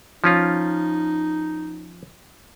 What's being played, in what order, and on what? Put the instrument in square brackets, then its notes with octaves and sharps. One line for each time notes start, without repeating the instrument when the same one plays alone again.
[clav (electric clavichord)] F3 C#4 F4 [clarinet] D#4